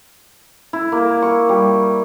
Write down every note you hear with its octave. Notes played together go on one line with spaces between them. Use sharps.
E4
A#3
C#6
G3